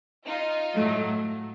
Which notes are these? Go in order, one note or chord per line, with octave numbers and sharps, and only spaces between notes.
D#4 F4
A2 F#3 A3